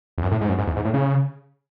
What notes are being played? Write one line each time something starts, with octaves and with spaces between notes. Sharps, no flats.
E2
F#2
A2
G#2
F#2
G#2
E2
G#2
A2
C#3